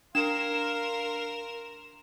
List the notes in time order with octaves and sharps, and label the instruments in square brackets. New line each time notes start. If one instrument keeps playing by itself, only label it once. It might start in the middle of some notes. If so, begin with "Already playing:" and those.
[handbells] D4 [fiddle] A#4 [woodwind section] F5 C6 [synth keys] E7